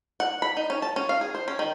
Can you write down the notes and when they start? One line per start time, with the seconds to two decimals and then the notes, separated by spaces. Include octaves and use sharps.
0.20 F#5
0.42 B5
0.57 D#4
0.70 C#4
0.82 A5
0.96 C#4
1.09 F5
1.21 G#4
1.35 C5
1.48 C#4
1.59 D#3